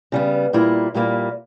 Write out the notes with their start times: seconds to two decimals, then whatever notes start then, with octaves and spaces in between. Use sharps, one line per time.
0.12 C#3 G3 B3
0.53 A#2 G3 A#3 E4
0.94 A#2 G3 A#3 E4